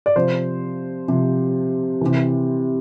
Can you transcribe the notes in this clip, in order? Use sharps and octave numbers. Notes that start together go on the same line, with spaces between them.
D5
C3 F3 C5
C3 F3
C3 E3